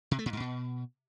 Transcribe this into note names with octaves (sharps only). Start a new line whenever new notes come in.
C3
A3
A#2
G#2
B2